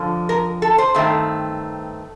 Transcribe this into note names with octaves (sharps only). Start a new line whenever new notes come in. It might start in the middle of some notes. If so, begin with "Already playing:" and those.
Already playing: F2 D3 F3
A#4
A4
C5
G2 D#3 A3 C4